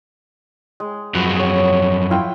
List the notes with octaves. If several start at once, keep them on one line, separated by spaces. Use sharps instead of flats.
G#3
F#2 F3 F#4 B4
G#4 C#5
E4 F4 G5